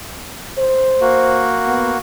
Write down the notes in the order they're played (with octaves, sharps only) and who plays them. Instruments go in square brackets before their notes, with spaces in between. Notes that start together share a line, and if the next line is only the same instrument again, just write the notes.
[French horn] C5
[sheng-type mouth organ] A#3 F#4
[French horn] B3